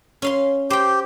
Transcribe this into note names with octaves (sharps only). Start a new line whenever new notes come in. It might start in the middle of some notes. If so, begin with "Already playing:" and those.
C#4 F5 C6
G4 C5 G5